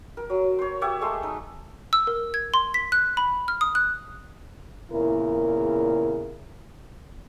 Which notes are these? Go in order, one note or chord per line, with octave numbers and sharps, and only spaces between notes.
A#4
F#3
C5 C#5
G4 C#5 E5 F#5
G#3 A3 C6
D#4
E6
A#4
G#6
C6
B6
F#6
B5
F6
D#6
F#6
E2 A#2 C#3 E4 A#4